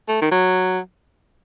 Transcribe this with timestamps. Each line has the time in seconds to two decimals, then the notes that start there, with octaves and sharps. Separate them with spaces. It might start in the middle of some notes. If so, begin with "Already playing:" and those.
0.08 A3
0.21 D#3
0.31 F#3